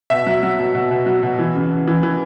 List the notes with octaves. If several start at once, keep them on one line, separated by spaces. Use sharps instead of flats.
B2 E5
F#3
F#3
B2
B2
B2
F#3
B2
E3
C#3
C#3
E3
E3